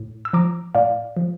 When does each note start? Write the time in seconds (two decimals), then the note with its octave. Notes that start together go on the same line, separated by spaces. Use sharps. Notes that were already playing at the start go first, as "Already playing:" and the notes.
Already playing: A2
0.25 E6
0.33 F3 A#5 D6
0.75 A2 D5 F5
1.17 F3